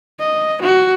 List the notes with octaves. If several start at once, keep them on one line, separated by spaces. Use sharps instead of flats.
D#5
F#4